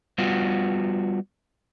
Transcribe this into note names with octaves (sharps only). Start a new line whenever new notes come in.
G3 B3 F4 F#4